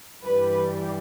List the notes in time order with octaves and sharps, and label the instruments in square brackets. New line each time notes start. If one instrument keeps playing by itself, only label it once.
[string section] G2 E3 G3 B4